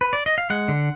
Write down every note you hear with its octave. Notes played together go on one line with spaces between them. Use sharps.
B4
D5
D#5
F5
G#3 F#5
D3